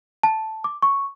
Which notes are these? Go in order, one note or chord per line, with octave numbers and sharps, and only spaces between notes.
A5
D6
C#6